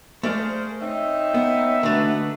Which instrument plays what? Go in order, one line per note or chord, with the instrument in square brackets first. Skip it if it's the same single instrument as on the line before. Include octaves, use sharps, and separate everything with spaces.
[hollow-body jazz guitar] A3 D5 F5 [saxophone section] G#4 A#4 C5
[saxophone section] C4 C#4 D#4 [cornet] E5
[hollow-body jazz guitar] B3
[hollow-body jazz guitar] D3 A3 [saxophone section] D#4 F#4 B4